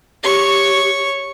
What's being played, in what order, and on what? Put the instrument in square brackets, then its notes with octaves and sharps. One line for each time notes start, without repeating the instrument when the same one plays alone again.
[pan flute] G4 [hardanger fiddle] C#5 C#6